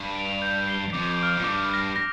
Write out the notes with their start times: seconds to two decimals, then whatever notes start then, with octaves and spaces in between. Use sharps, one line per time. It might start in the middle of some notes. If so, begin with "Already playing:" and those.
Already playing: G2
0.15 D7 F7
0.42 G6
0.67 C7 G7
0.93 F2 D6
1.18 F6 D7
1.37 A#2
1.44 G2 D6
1.70 F6 A#6
1.96 A#6